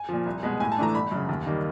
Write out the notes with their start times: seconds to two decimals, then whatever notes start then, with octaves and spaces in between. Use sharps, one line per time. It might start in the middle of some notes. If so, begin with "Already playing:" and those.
Already playing: G#5
0.09 A#2 F3
0.26 C2
0.43 B2 G#3
0.60 A2 G#5
0.72 A5
0.78 E3 A3 D4 A#5
0.94 G1 B5
1.11 F#2 C#3
1.29 D#2
1.46 D#3 G3 A#3 D#4